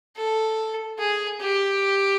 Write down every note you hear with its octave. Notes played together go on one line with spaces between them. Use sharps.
A4
G#4
G4